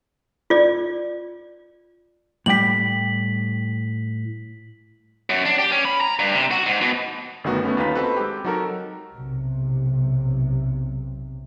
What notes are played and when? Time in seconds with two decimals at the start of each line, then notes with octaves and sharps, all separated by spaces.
0.50 F4 D5
2.46 A2 G3 G5 B6 F#7
5.30 F#2
5.45 D4
5.58 G4
5.71 C#4
5.85 B5
6.01 A#5
6.19 G2
6.34 C3
6.51 F#4
6.66 G#2
6.81 B2
7.44 G1 D#3 A3 B3 F#4
7.63 A3 B3 C#4
7.77 D#2 D#4 F4 B4 B6
7.95 C4 F#4 A4 B4
8.17 G#3 G4
8.44 F#3 D#4 F#4 A4 A#4
9.14 B1 C3